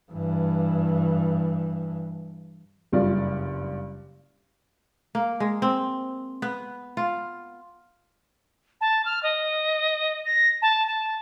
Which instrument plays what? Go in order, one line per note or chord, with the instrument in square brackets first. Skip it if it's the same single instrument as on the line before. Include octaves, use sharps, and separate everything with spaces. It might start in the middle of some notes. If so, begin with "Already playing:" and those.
[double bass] G2 E3
[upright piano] F#1 G2 F4 D5
[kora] A#3
G#3
C4
B3
F4
[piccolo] A5
F6
D#5
A#6
A5
A5